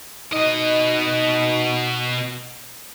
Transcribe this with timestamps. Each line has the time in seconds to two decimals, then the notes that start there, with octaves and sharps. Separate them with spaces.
0.33 B2 D#4 D#5